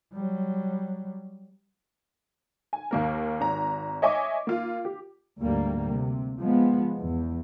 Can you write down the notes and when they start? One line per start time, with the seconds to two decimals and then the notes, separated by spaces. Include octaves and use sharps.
0.13 F#3 G3
2.73 G#5
2.91 D#2 A#3 A#4
3.40 G#1 A#5
4.02 C#5 D#5 E5 G#5 C#6 D6
4.47 A#3 F4
4.85 G4
5.39 D2 G#2 G3 A#3
5.88 C3
6.40 F3 G#3 B3
6.98 E2